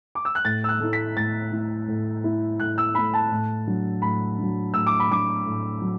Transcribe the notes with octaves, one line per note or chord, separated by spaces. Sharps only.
D6
E6
F#6
A2 A6
E6
F#6
A3 E4
B6
A2 A6
A3 E4
A2
A3 E4
A2 F#6
E6
A3 E4 B5
A5
A2
F#3 D4
A2 B5
F#3 D4
A2 E6
D6
B5
F#3 D4 D6
A2
F#3